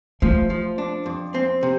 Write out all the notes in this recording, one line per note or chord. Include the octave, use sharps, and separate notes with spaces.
F3 A3
F3
D4
F2
C4
C3